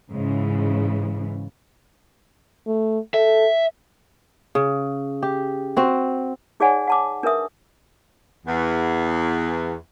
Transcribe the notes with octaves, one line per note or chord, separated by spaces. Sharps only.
G#2 C#3 E3
A3
A4 E5
C#3
G4
C4 F#4
D#4 G#4 C#5 D5 F#5 G#5
F#5 A5 D6
D4 A#4 B4 E5 D#6
E2